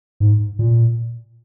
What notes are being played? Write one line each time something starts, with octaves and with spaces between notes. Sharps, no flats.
G#2
A#2